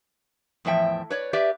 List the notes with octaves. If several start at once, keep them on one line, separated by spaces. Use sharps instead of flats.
E2 A2 F3 E5 G5
B4 C#5 D5
G4 B4 D5 E5